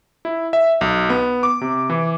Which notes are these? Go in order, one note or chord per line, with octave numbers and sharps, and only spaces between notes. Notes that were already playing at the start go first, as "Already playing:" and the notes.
E4
E5
B1
B3
D6
C3
E3